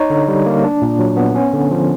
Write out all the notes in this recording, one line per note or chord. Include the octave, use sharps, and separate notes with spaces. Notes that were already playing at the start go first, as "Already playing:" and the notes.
Already playing: D#4 C#5
D3
G3
A#3
D4
A#2
F#3
B3
C#4
D3
F3